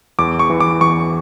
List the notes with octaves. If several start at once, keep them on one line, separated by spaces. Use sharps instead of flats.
E2 D6
C#6
E3
D6
E2 C#6